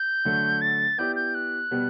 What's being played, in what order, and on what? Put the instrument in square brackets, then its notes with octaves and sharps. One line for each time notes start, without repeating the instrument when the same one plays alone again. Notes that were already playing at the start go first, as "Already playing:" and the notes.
Already playing: [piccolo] G6
[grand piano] D3 F#3 A3
[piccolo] A6
[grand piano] B3 E4 G4 D5 [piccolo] G6
[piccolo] G6
F#6
[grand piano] B2 G3 B3